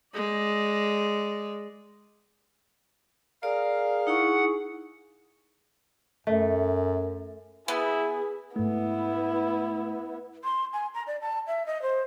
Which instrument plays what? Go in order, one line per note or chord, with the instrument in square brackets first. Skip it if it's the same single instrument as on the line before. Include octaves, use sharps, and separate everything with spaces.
[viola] G#3 D5
[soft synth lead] G#4 [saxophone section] A#4 F5 [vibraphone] D5
[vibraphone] D#4 E4 C#6 [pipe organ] F#5
[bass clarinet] F#2 [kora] A3
[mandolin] B3 [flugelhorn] E4 [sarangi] G#4
[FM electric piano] G#2 A3 [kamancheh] B3 E4
[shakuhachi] C6
G#5
A#5
D5
A5
E5
D#5
C5